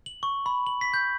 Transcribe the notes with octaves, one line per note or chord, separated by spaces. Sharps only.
F#7
C#6
B5
F#7
B6
G6